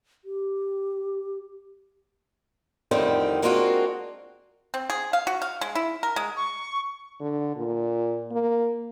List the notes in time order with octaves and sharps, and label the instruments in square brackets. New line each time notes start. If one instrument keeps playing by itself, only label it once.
[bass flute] G4
[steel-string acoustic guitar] F2 A2 D3 D#3 G3 C4
G#3 A#3 C4 D4 F4 F#4
[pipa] C4
G#4
F5
F#4
F5
G#3
E4
A#4
G#3
[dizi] C#6
[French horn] D3
A#2
A#3